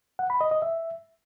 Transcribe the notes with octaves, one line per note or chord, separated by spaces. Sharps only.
F#5
B5
D#5
D#5
E5